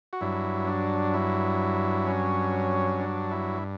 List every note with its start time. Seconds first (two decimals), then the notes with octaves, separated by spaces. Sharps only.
0.13 F#4
0.21 G2 F#3 E4
0.67 D4
1.14 E4
2.07 C#4
3.00 D4
3.31 E4